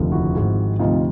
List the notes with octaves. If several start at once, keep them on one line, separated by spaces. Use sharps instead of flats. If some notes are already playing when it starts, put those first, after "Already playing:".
Already playing: F1 D#2 D3 F3
E4 F#4
G#1 G#2 F3
D2 C3 F3 D#4 F4